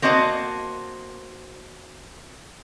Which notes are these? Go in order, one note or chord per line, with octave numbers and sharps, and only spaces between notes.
A#3 C4 F#4 D#5 A5